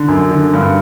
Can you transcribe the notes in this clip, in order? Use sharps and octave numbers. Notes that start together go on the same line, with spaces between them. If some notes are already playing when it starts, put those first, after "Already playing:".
Already playing: D3
F#2
D3
G2